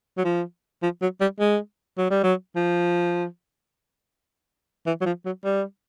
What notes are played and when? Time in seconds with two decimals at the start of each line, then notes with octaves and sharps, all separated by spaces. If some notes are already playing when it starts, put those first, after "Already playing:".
0.18 F#3
0.24 F3
0.82 F3
1.01 F#3
1.21 G3
1.40 G#3
1.98 F#3
2.10 G3
2.23 F#3
2.56 F3
4.86 E3
5.01 F#3
5.06 F3
5.25 F#3
5.44 G3